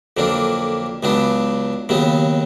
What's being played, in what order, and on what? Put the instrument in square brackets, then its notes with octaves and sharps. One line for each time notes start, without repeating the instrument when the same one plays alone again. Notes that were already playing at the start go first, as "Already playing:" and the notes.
[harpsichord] F2 D3 F#3 A#3 D4
C#2 C#3 F#3 B3 D4
D#2 C#3 F#3 B3